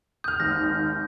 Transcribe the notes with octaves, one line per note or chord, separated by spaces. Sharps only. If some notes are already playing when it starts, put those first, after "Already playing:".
D#6 F6 G6
G#1 D#2 A#6